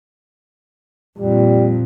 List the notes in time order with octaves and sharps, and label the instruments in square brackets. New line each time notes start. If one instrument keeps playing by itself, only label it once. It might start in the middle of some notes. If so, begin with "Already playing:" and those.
[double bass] F2 A#2 [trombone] G3